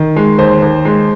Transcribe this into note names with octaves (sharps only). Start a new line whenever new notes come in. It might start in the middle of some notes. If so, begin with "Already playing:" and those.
Already playing: D#3
G#3
D#2 C5
D#2
G#3